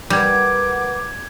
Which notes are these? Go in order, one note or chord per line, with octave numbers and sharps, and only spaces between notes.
G3 A#4 B4 F#5 D6 G6 G#6